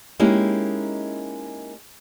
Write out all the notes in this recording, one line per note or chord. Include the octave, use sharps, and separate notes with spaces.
G#3 A#3 C#4 D#4 E4 G4